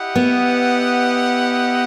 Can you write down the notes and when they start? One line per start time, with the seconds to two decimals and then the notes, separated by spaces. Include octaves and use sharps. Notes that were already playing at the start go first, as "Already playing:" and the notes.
Already playing: E4 G4 D#5 F#5
0.16 B3